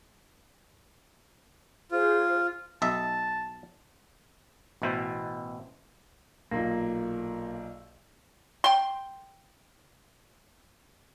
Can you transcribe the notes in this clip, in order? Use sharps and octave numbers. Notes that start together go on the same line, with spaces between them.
F4 G#4 C5
B1 D#5 E5 A5
A1 B2 E4 B4 C5
B1 A#2 A#3
G5 C6